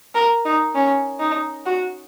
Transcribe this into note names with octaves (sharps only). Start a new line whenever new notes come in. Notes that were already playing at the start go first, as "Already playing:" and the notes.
A#4
D#4
C#4
D#4
F#4